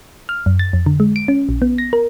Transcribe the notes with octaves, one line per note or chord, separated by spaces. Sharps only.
F6
F#2
A6
F2
D3
G#3
D7
C#4
A#1
B3
A#6
A#4